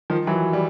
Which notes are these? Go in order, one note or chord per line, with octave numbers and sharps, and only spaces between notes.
D#3 F3
E3 F#3
G3